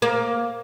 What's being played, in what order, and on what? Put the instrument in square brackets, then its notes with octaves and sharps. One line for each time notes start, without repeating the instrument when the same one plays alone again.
[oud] A#3